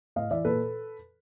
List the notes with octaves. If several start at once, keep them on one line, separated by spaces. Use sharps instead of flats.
A2 D#5 F5
E3 D5 E5
A#2 A4 B4